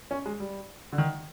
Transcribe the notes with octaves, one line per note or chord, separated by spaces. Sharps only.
C#4
G#3
G3
D3
D#3